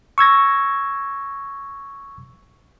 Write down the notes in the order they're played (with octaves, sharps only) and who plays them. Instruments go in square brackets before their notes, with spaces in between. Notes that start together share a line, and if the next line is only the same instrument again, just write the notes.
[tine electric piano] C#6 E6 G#6 A#6